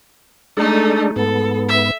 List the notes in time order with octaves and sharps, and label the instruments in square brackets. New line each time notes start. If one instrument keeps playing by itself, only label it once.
[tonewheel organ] G#3 D4 A4 [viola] A3 D#4
[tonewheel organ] G#2 B3 [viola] A4
[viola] E5